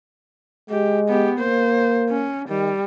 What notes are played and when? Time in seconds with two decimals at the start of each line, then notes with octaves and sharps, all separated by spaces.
0.70 G#3 G4
1.08 B3 G4
1.39 A#3 C5
2.10 C#4
2.49 D#3 G3